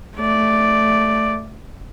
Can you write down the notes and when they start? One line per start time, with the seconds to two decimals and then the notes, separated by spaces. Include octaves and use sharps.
0.17 A3 D5